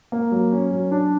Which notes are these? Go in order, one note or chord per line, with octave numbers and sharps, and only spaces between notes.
A#3
F#3
C#4
F#3
D4